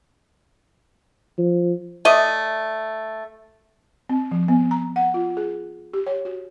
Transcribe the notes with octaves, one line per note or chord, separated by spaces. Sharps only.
F3
A3 D5 D#5
C4
F3
B3
A#5
F#5
F4
G#4
G4
C#5
F#4